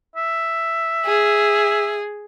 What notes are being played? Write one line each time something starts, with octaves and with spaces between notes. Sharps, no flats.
E5
G#4